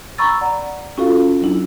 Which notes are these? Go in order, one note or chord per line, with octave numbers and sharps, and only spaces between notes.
A#5 B5 C#6 E6 A6
D5 F#5 A#5
C#4 F4 F#4 A4 F5
F#3 D4 E4